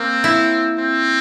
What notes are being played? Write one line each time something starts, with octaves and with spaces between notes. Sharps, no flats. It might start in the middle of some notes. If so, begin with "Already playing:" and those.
Already playing: A#3 C4
E4
C4